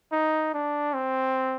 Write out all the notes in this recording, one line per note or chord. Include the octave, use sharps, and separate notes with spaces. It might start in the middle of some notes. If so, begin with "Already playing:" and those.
D#4
D4
C4